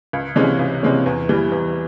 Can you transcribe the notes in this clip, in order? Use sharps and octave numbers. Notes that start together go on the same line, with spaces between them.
C#2
C3 E3 G#3 C#4
C#2
C3 E3 G#3 C#4
E2
E3 G3
E2